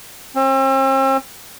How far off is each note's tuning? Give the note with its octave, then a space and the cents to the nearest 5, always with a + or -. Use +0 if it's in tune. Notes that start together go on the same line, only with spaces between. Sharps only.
C4 +45